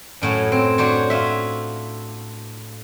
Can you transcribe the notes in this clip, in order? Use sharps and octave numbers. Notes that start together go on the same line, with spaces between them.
F#2 A2 F#3
C4
D4 F#4 C5 C#5
F4 F#4 E5